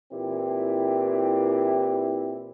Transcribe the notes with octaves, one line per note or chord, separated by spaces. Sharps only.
A#2 E3 C4 E4 G4